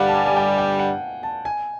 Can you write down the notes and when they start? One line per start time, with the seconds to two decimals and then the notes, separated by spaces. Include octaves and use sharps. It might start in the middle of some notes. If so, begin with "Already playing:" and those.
Already playing: G2 D3 G3 F5 F#5
0.08 A5
0.15 G#5
0.26 G#5
0.36 G5
0.58 G5
0.79 F#5
1.23 A5
1.45 G#5